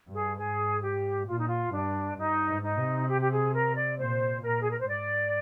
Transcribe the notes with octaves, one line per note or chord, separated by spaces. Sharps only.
G2
G#4
G#2 G#4
G4
A#2 F4
D#4
F4
G2 D4
G2 D#4
G#2
D#4
C3
G4
G4
G#4
A#4
D5
A#2 C5
A#2 A#4
G#4
A#4
C5
G#2 D5